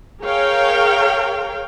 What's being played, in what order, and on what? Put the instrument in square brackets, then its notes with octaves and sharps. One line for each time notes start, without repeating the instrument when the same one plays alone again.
[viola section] G#4 A#4 C#5 F5 G5